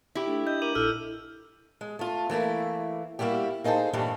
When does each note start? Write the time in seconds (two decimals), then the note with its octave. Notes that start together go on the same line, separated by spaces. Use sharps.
0.15 E4 G4
0.28 A3 D4
0.47 D#5 G6
0.62 A#4 D6 D#7 F#7
0.75 A#1 E4 A4 E6 F6
1.81 G#3
1.99 A3 F4
2.29 E3 A3 A#3 E4
3.19 G3 A#3 E4 F#4 G4
3.64 A#3 D#4 G#4 A4 C5
3.93 G2 A#2 E3 G3 A3 E4